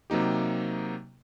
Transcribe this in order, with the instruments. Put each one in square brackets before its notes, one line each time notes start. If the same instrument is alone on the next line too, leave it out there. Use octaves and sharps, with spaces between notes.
[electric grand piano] C3 F#3 A#3 D#4 G4